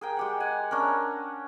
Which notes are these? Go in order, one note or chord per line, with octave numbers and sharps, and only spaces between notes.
G#4 A#4 G5
G#3 G4 F#5
F#5 G#5
C#4 D4 A#4